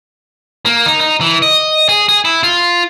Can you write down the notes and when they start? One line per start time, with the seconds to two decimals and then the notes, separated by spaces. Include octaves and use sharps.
0.66 A#3
0.86 D#4
1.00 D#4
1.21 E3
1.42 D#5
1.89 G#4
2.09 G#4
2.25 E4
2.43 F4